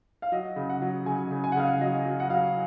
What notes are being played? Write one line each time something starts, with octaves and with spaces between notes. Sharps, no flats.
F5
F#3 D#5
C#3
F#5
F#3
C#3 G#5
C#3
G#5
F#5
C#3 F5
F#5
F#3 D#5
F#3
F#5
F#3 F5